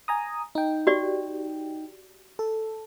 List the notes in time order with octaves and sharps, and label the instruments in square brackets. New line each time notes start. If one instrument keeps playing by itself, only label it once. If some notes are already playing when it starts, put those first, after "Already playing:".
[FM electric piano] G#5 A#5 D#6
D#4 G5
[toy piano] F#4 G4 D5
[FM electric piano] A4